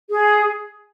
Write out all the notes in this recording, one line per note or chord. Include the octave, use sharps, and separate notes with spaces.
G#4